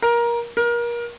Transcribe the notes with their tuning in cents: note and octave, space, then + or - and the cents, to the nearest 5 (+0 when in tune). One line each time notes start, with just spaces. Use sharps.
A#4 +20
A#4 +30